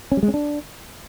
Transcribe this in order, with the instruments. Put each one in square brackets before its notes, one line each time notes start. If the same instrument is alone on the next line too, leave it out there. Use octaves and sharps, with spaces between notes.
[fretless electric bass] C#4
G3
G#3
C#4
D4